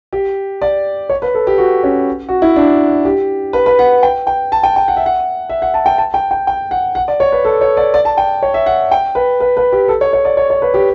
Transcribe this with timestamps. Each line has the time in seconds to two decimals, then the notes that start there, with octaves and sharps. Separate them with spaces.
0.13 G4
0.62 D5
1.10 C#5
1.22 B4
1.35 A4
1.47 G4
1.58 F#4
1.84 C#4
2.29 F#4
2.42 E4
2.56 D4
3.05 G4
3.53 B4
3.66 B4
3.79 F#5
4.03 G5
4.27 G5
4.52 A5
4.63 G5
4.76 G5
4.88 F#5
4.97 E5
5.06 F#5
5.49 E5
5.62 F#5
5.74 A5
5.86 G5
5.98 A5
6.14 G5
6.31 G5
6.47 G5
6.71 F#5
6.95 F#5
7.08 D5
7.20 C#5
7.32 B4
7.45 A4
7.61 C#5
7.77 D5
7.94 D5
8.05 A5
8.17 G5
8.42 C#5
8.54 E5
8.66 F#5
8.91 G5
9.15 B4
9.40 B4
9.57 B4
9.72 G4
9.88 A4
10.01 C#5
10.13 C#5
10.25 D5
10.37 C#5
10.50 C#5
10.62 B4
10.74 G4